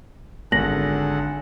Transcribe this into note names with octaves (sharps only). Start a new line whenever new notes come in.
G#1 D3 G#4 A4 F#5 A#6 F#7